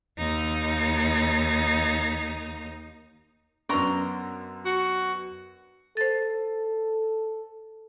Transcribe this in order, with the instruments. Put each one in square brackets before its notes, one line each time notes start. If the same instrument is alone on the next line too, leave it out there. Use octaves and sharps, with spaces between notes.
[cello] D#2 D#4
[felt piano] F#2 B3 D4 [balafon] C#4 C#6 [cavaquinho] A#4 A#5 C6
[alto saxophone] F#4
[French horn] A4 [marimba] C5 A6